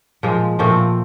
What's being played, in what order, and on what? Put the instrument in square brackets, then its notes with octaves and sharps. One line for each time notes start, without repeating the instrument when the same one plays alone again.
[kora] A#2 F3 G#3
A#2 F3 A3 C4